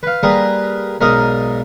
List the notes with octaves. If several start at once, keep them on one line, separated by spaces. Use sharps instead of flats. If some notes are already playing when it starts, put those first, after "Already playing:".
B4 F5
G3 A#3 G#4 A#4 B4
B1 G#2 A#4 D5 F5 D#6